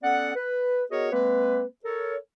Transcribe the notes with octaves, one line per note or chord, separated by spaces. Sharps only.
B3 C#4 A4 D5 F#5
B4
B3 F#4 G#4 A#4 C#5 D#5
G#3 A#3 C4 B4
A4 A#4 C#5